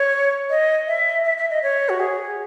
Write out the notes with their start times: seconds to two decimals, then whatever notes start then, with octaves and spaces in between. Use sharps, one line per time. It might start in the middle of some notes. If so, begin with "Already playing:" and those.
Already playing: C#5
0.50 D#5
0.88 E5
1.25 E5
1.37 E5
1.50 D#5
1.63 C#5
1.89 F#4
2.00 G#4